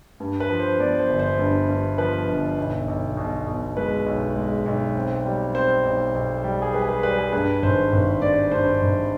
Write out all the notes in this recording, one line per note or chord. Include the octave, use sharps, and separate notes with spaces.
G2
B4
F3
C5
B3 D5
C5
G1
C5
G2
G2
F3 B4
G1
B1
B1
B2
B2
G#3 B4
B1
G#3
B1
C4
G3
C4 C5
B1
B1
G3
G#4
G3 B4
G#4
B4
G3 B4
G#4
G2 B4
G#1 C5
G#1
G2 D5
G2 C5
G#1